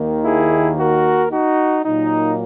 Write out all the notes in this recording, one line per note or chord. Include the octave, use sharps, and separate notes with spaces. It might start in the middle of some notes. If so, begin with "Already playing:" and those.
Already playing: D#2 D#3 A#3
E4 G#4
F#4 A#4
D#4 F#4
A#2 F#3 A#3 D#4